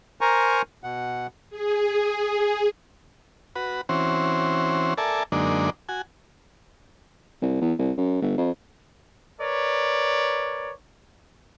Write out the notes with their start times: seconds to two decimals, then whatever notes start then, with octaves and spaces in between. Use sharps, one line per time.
0.21 A#4 C5 G#5 A#5 C#6
0.84 B2 F#5
1.50 G#4
3.56 F#4 B4
3.89 E3 C4 C#4 F#4 C5
4.98 A4 A#4 D5 E5 G#5 A5
5.32 F#2 D3 G#3 A#3 D4 D#4
5.89 F#4 G#5
7.42 C2
7.61 E2
7.79 C2
7.97 F#2
8.22 G1
8.38 F2
9.41 A#4 B4 C#5 D5